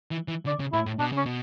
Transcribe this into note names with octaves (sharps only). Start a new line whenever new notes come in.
E3
E3
D3 D5
C#3
A2 E4
A2
B2 D4
C#3 C#4
B2